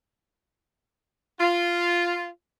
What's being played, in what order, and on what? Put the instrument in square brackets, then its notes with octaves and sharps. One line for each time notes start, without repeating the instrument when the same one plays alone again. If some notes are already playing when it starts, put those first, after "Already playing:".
[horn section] F4